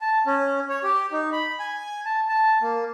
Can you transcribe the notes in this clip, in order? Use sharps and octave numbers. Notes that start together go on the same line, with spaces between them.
A5
C#4
C#5
G4
D#4
B5
G#5
A5
A5
A#3